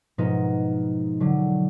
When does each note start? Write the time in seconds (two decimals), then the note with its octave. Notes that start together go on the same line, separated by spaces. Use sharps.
0.18 G#2 B2 F3 B3 D#4
1.20 D3 F#3